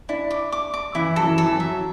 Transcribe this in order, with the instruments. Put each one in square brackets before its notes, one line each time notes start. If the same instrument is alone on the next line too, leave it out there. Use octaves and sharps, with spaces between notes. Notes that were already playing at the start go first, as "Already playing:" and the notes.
[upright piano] D4 [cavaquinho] E4
[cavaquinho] D6
D6
D6
[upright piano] E3 [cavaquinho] E4
[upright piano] F#3 [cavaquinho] A4
[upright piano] E3
[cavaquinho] A4
[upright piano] E3
F#3
[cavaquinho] E5